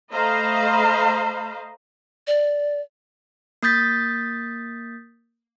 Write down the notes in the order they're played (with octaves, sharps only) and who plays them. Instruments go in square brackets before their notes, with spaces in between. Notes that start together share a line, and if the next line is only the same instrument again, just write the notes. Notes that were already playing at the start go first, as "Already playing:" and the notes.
[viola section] A3 C5 D#5 F5 A#5 B5
[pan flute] D5
[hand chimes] A#3 D#6 G6 A6 B6